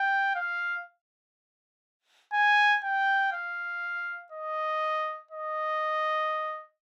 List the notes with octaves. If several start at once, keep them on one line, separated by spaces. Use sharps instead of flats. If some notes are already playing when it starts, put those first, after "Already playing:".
Already playing: G5
F5
G#5
G5
F5
D#5
D#5